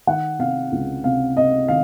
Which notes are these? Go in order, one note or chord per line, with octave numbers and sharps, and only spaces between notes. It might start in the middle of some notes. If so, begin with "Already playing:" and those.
D#3 F#5
C3 F5
C#2
C3 F5
C3 D#5
D#3 F5